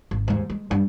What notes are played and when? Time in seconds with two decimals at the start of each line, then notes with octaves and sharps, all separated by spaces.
0.11 G#1
0.28 D#2 G#2
0.50 G#3
0.71 G2